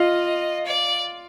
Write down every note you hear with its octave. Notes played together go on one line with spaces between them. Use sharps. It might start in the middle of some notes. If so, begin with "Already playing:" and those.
Already playing: F4 D#5 F5
D5